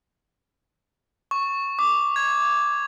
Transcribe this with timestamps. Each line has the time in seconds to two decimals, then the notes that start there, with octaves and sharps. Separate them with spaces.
1.31 C#6
1.79 D6
2.16 G#6